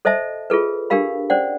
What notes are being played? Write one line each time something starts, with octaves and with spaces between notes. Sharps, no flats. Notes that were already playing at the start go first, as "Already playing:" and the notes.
A4 C5 D#5 E5 A5
F4 G#4 A4 B4
D4 G4 A4 A#4 F5 B5
C#4 C5 D5 F#5